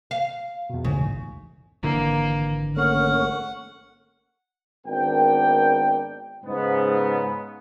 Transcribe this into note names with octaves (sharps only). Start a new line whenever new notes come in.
F5
E2 B2
A1 D2 G#2 C#3
G#1 D3 E3 A#3
A3 A#3 C#4 F#5 C#6 F6
G#1 B3 D4 A#4 G5
G#2 C#3 B3